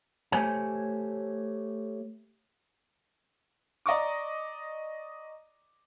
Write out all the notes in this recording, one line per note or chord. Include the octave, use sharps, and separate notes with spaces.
A3 G4 C5 C#5 G#5
D5 D#5 A#5 C#6 D6